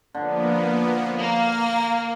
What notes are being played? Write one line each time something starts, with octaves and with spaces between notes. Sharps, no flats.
D3 F3 A#3 B3
A#3 F6